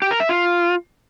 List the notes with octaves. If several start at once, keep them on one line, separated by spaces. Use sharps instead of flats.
G4
A#4
E5
F4